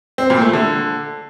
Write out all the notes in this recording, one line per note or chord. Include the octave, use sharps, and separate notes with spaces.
C4
A#2
A3
D3